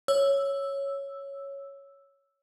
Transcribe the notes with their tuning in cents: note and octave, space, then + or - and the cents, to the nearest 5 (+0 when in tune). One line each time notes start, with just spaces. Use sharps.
C#5 +0 E6 +0